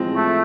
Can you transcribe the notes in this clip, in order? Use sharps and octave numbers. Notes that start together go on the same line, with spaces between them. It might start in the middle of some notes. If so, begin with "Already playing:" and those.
Already playing: A2 F3 G#3 C4
A3